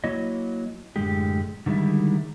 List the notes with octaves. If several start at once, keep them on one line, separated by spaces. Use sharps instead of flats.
F#3 A#3 E4 C#5 D#5
F#2 A2 D3 G#3 G4
D3 D#3 G3 G#3 E4